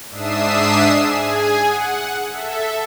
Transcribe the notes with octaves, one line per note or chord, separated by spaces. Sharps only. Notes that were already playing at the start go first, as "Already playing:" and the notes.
G#2 D4 E5 D#6 C7 E7
G#4 G#5
F#5
A4 E5